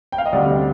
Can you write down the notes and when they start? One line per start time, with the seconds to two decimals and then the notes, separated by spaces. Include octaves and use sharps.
0.12 G5
0.18 F5
0.26 D#5
0.32 D2 C3 G3 C4 D5